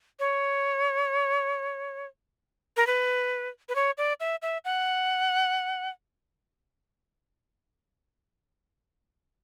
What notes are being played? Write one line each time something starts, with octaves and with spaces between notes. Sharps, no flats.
C#5
A#4
B4
B4
C#5
D5
E5
E5
F#5